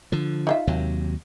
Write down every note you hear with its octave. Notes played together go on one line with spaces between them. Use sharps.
D3 F3
D#4 F4 E5
D#2 C3 F#3